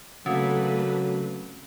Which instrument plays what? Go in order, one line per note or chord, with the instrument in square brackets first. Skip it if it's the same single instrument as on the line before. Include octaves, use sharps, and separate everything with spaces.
[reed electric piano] C#3 A4 [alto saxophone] F#3 [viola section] A3 A#3 B4 [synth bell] C4 C#4